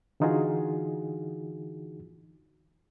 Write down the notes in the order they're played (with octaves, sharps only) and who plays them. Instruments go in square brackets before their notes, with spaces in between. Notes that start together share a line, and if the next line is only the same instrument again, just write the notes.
[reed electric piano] D3 E3 D#4 F4 F#4 G#4